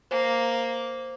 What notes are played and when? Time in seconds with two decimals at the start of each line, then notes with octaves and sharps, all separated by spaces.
0.11 A#3 C5